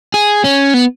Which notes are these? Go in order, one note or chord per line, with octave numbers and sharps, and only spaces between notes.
G#4
C#4
B3